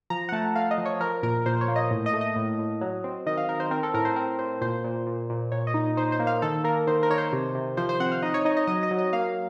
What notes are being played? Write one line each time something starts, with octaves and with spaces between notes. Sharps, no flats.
F3 A#5
F#5
A3 A5
A3 F5
D#5
F3
C#5
F3 A#4
A#2 A#4
A#2 C5
C#5
A#3
D#5
A2
D#5
A3
D#5
A2
A2
F#3
C4
D#3 D#5
F5
D#3 A#4
C5
C4 A#4
A4
A2 A#4
C5
C4 A#4
A2 C5
A#2 C5
A#2
A#2
A#2
A#2 C#5
D#5
D#4
D#4 C5
C5
A#3
F5
D#3 A4
A#3 A#4
D#3 C5
A#4
D#3 C#5
C5
C3
C3
F3 C5
C5
C4 F#5
F5
D#4 D#5
C#5
D#4 D#5
D#5
F#3 D#5
D#5
F#3
D#5
A#3 F5